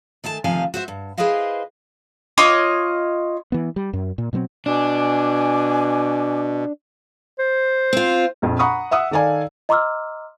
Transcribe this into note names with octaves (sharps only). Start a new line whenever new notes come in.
D#3 A3 G#5 A5
D2 C3 D#3 F3 F5 G#5
F#4 C5 E5
G2
E4 G#4 B4 C5 D#5 F5
F4 C#5 D#5 D6
E3 B3
G3
F#2
A#2
B2 F#3 G#3 C4
B2 D4 G#5 D6
C5
C4 F4
A#1 F2
F#5 A#5 B5 C#6 D#6
E5 F#5 D#6 E6
D#3 A4 D5 F5 G#5
D#5 A#5 C6 D6 E6 F6